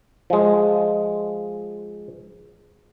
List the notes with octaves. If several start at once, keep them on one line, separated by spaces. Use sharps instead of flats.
F3 G#3